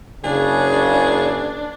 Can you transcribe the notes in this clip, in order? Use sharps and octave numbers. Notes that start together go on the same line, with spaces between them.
F#1 C#3 D4 G#4